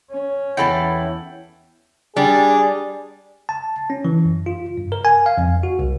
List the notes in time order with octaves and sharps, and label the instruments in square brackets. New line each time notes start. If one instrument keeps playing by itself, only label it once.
[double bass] C#4
[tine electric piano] E2 G5 [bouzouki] E3 A4 A5 [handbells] F#5 B5
[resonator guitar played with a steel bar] G3 [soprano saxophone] D4 [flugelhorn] G#4
[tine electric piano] A5
C#4
E3
F#2
F4
G2
A#4
G#5
F5
F2
F#4
C2